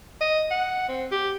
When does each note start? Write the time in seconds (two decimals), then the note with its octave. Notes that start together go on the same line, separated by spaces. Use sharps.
0.21 D#5
0.51 F#5
0.89 C4
1.11 G4